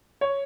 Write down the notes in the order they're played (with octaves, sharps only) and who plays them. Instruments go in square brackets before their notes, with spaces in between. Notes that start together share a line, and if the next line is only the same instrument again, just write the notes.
[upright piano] C#5